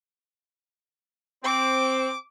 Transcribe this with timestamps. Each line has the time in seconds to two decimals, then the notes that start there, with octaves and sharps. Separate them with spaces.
1.44 C4 D6